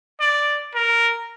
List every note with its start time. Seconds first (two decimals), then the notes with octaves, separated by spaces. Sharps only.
0.20 D5
0.75 A#4